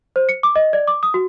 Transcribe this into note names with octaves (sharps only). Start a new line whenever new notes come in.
C5
C#7
D6
D#5
D5
D6
D#6
F#4